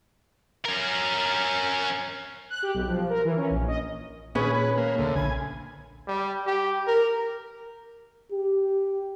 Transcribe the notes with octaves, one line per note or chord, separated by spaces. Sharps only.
C#4 A#4
F#6
G4
B1
F3
A#4
E3
C#4
A#1
D#5
A#2 D#3 C#4 G#4 B4
B4
A#3 F6
D2 C#3 C#4
A#1 G#5 B5
G3
G4
A#4
G4